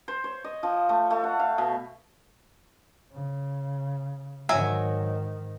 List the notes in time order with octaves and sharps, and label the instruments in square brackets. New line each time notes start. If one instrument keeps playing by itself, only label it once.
[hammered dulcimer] C5
C#5
D#5
F3
A3
A3
F#5
F5
B2
[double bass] C#3
[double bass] G#2 D#3 [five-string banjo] F#3 E5 G#5